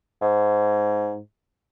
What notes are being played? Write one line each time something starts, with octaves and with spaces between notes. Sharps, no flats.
G#2